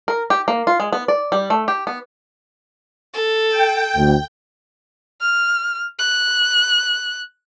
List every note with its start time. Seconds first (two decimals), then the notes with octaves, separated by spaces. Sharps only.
0.08 A#4
0.30 G4
0.48 A#3
0.67 F4
0.80 G#3
0.93 B3
1.08 D5
1.32 G3
1.50 A3
1.68 G4
1.87 B3
3.14 A4
3.50 G5
3.96 D2
5.20 F6
5.99 F#6